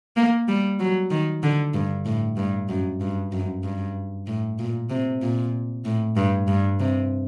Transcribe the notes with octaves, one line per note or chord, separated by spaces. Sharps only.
A#3
G3
F#3
D#3
D3
G2
A2
G2
F#2
G2
F#2
G2
A2
A#2
C3
A#2
A2
G2
G2
C3